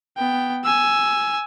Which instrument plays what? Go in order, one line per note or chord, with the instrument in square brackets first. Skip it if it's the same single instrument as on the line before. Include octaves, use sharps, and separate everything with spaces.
[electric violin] B3 G5
G#5 E6